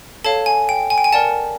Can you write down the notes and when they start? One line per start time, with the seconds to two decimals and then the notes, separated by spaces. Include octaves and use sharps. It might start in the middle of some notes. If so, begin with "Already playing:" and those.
0.24 A4 C#5 F5 A5
0.46 G#5
0.69 G5
0.90 G#5
0.98 G5
1.04 G#5
1.12 A#4 D5 F#5 A5